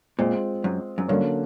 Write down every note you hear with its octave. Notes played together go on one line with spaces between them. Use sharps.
A#2 G#3 C4 F4
F#2
F#2
G2 D3 F#3 A#3 C#4